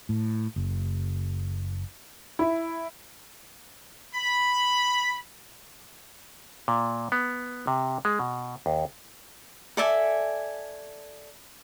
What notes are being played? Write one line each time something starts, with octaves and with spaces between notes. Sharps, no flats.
A2
F#1
E4
B5
A#2
B3
C3
G#3
B2
D#2
A4 D5 E5 G#5